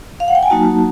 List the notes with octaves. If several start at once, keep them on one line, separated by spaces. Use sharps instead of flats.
F5
F#5
G5
G#5
F#3 A#3 D#4 F#4 A5